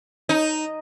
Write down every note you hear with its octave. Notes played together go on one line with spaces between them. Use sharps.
D#4